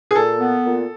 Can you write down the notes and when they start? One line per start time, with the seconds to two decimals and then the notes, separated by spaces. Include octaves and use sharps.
0.11 G#4
0.15 A#2 A4
0.40 B3
0.65 A#2